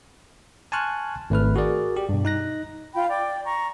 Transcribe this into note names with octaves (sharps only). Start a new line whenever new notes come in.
G#5 A5 C6 C#6 F6 F#6
G#1 A3 B4 F6
F#4 G#4 A#4 D5
G4
G2 B2
D#4 F#6 A#6
F4 G5 B5
D5 G5
A#5 C#6